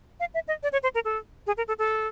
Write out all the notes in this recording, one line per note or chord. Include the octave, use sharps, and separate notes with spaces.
F5
E5
D#5
D5
C#5
C5
A#4
A4
G#4
A#4
A4
A4